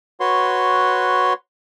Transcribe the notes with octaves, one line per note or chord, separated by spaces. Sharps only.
F#4 B4 C#5 C6